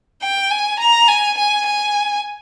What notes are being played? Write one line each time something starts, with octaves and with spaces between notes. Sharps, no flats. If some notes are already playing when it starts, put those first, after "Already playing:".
G5
G#5
A#5
G#5
G#5
G#5